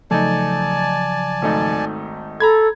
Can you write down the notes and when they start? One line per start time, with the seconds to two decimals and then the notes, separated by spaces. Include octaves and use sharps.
0.11 C#3 F3 F#3 A3 D#4 D5 G#5 A5
1.42 G#1 A3 D#4
2.40 A4 A#5 B5 G#6